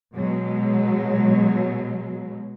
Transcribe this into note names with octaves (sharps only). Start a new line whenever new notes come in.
B2 F#3 G#3